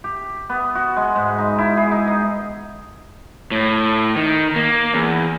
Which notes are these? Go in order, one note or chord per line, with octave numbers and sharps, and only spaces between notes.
G4
B3
F#4
G#3
G#2
D#4
E4
G#4
D#4
D#5
A2
D#3
A#3
E2